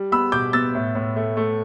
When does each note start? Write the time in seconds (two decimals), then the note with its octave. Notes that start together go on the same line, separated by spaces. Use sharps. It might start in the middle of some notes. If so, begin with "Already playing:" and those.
Already playing: G3
0.12 B3 B5 E6
0.32 B2 D6 G6
0.53 B3 E6 A6
0.75 A2
0.95 A2
1.16 A3
1.37 A3